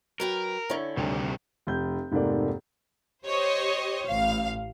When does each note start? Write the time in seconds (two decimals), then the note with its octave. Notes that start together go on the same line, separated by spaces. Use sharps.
0.20 F#3 A#4 B4 G5
0.70 D3 C#4 E4 C#5 E5
0.97 D2 C3 D#3 G3
1.67 F1 G6
2.11 F1 G#2 C3 A3 A#3 D5
3.26 G4 C5 C#5 D#5
4.06 A1 F5